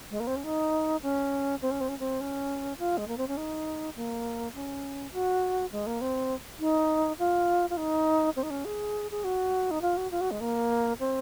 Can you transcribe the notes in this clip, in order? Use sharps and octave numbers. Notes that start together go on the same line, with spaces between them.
G#3
A#3
C4
C#4
D#4
C#4
C4
C#4
C4
C#4
C4
C#4
F4
G#3
A#3
C4
C#4
D#4
A#3
C#4
F#4
G#3
A#3
C4
D#4
F4
F4
D#4
C4
D#4
C#4
G#4
G#4
F#4
D#4
F4
F#4
F4
F#4
G#3
A#3
C4